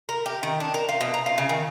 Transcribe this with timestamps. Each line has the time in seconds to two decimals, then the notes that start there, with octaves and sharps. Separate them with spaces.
0.09 A#4
0.26 G4
0.43 D#3
0.60 D4
0.74 A#4
0.89 F4
1.01 B2
1.14 A#5
1.26 F4
1.38 C#3
1.49 D#3